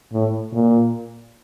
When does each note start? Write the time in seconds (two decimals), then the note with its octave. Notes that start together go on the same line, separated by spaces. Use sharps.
0.13 A2
0.54 A#2